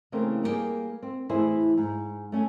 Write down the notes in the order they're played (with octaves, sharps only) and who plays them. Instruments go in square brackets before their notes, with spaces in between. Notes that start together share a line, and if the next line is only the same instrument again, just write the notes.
[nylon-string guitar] C#3 E3 A3 A#3 C4
G3 A#3 B3 G4 G#4
C4
A2 E3 E4 G#4 C5 E5
G#2
A3 C#4 A4 G#5